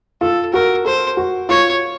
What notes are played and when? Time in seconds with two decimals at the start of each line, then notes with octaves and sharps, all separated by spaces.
0.21 F4 A4
0.53 F#4 A#4
0.85 A4 C5
1.17 F#4
1.49 F4 C#5